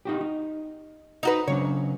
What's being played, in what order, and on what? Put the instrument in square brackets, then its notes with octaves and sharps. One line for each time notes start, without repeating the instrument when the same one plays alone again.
[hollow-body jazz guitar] D#4 F#4 G4
D#4
[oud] D#4 F#4 B4
[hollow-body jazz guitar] C#3 F#3 D4 [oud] C#5